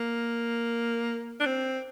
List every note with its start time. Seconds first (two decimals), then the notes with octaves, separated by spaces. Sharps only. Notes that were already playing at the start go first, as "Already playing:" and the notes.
Already playing: A#3
1.40 D4
1.46 C4